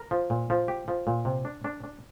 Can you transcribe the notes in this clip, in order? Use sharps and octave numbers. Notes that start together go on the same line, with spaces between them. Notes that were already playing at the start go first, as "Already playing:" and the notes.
Already playing: A#4
F3
A#2
F3
G4
F3
A#2
C3
D4
D4
D4